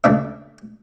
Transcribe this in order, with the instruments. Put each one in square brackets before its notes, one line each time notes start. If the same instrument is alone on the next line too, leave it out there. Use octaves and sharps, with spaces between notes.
[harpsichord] C#2 A3 D4 E5